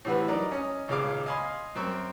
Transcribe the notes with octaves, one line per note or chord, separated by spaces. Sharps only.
A2 C3 E3 F#4 B4
F#3 D#4 A#4 D5
C#4 D#5
G#1 C#2 A#2 G#3 F5 D6
D#5 F5 G#5 B5 C6
F#2 C4 A#4 G5 C#6